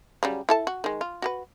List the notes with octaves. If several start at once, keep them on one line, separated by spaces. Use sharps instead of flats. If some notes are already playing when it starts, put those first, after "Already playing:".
C#3 F#3 G3
E4 A4 A5
F#4
D#3 G#3
F4
F#4 G4 B4